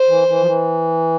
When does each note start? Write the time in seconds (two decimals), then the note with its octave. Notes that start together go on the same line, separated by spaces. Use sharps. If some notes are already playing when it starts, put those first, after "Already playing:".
Already playing: C5
0.09 E3
0.28 E3
0.41 F3
0.46 E3